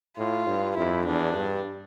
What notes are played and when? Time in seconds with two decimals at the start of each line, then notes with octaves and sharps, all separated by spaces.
0.18 A2 F4
0.47 G2
0.77 F2 E4
1.06 E2 D4
1.36 G2